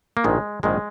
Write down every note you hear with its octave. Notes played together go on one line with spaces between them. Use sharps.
A#3
A#1 G#2 D#3 G#3
A#1 G#2 D#3 G#3